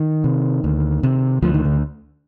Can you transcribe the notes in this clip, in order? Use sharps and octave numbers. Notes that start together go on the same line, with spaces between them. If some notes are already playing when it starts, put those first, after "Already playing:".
Already playing: D#3
C3
D2
C3
D2 F3
D#3
D3